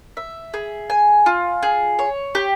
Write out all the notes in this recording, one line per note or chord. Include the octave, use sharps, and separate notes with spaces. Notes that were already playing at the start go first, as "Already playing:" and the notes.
E5
G#4
G#5
F4
G#4
C#5
G4